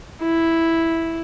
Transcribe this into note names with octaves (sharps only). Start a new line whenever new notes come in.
E4